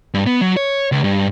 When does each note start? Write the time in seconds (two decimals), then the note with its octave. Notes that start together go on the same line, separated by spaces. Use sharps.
0.14 G2
0.27 B3
0.41 F#3
0.57 C#5
0.92 C#2
1.04 G2